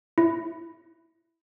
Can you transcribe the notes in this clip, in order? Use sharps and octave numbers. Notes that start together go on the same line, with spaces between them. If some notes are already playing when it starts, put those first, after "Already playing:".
E4